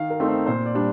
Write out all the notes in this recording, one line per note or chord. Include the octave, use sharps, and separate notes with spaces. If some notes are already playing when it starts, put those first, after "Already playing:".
Already playing: D#3 F5
A#4
A3 C4 D#4
C5
A#2 C5
D5
G3 D4